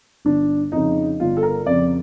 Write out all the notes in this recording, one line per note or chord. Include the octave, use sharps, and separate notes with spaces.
G1 D4
F2 C#3 D#4
G1 F4
A4
A#4
F2 C#3 D5